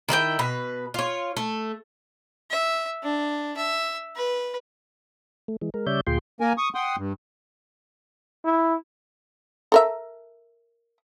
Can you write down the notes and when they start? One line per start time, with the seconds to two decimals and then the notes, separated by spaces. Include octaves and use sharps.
0.09 D#3 E4 F#4 G5
0.39 B2 B4
0.94 F4 C#5
1.37 A3
2.51 E5
3.03 D4
3.57 E5
4.16 B4
5.48 A3
5.61 E3 G#3
5.74 G#3 A#4
5.87 C#3 G3 C#5 D5 E5 G6
6.07 D2 A#2 F4 G#4 G5 C6
6.40 A#3 A#4 G#5
6.58 C#6 D#6
6.75 F#5 G5 C6 D#6
6.97 G2
8.45 E4
9.72 A4 A#4 E5